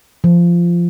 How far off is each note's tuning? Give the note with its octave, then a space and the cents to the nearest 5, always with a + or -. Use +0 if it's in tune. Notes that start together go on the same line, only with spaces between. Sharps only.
F3 -15